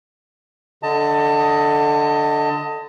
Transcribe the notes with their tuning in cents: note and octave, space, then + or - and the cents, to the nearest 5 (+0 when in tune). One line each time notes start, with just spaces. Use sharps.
D3 +0 D#5 +15 A5 +30